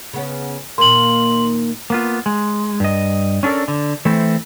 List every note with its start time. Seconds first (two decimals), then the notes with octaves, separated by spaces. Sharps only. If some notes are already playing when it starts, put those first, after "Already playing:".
0.13 C#3 B3 C#4
0.78 A#2 D#3 A#3 C6 F#7
1.90 A#3 B3 F4
2.26 G#3
2.80 G2 D#5
3.43 C#4 D4 F4 A4 A#4
3.68 D3
4.05 E3 A3 C4 E4 A4 C5